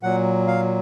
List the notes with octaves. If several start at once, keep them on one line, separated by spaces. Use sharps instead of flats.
A#2 F#3 F#5
F5